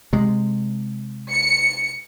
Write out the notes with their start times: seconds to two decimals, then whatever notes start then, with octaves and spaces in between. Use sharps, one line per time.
0.13 C3 G#3
1.31 C#7